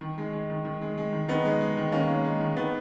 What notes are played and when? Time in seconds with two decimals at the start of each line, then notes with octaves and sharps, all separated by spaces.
0.01 D#3
0.18 G#3
0.33 G#3
0.50 D#3
0.65 D#3
0.81 G#3
0.97 G#3
1.13 D#3
1.28 D#3 B3 D#4
1.45 G#3
1.61 G#3
1.77 D#3
1.92 D#3 A#3 C#4
2.08 G#3
2.24 G#3
2.41 D#3
2.57 D#3 B3